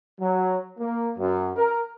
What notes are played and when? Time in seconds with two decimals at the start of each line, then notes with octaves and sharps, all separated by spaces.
0.20 F#3
0.78 A#3
1.18 F#2
1.56 A#4